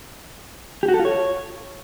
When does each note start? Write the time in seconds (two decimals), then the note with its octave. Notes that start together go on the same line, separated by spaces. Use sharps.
0.83 G4
0.88 F#4
0.94 A4
0.99 F4
1.05 C#5